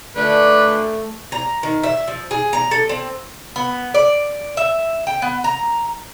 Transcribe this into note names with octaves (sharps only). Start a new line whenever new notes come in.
A#2 D3 A3 B4
A#5
D#3
E5
F3
G#4
A#5
A4
C4
B3
D5
E5
G5
B3
A#5